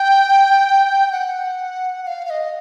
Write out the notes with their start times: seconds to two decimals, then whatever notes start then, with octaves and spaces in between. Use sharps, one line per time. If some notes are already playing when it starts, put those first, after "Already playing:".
Already playing: G5
1.12 F#5
2.03 F#5
2.07 F5
2.25 F5
2.30 D#5